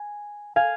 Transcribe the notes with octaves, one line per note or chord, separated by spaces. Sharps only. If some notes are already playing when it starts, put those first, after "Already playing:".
Already playing: G#5
F5 G#5